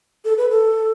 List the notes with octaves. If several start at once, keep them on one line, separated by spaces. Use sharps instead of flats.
A4
B4
A4